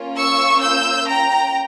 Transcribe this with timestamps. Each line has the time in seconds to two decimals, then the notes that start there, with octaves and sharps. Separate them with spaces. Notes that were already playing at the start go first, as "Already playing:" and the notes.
Already playing: A#3 C#4 F4
0.16 C#6 E6
0.61 E6 G6
1.07 G5 A#5